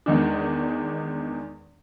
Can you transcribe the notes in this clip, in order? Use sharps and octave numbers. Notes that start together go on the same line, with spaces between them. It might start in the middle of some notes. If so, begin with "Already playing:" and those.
E2 D#3 G#3 D4